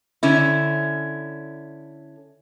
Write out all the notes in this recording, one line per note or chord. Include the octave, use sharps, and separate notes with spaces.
D3 C#4 E4